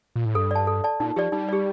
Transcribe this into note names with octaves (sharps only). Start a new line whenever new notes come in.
A#2
A2
G2 A4
D5 A5
A4
D5 A5
A#2 D#4
F3 G4 D5
G3 D#4
G4 D5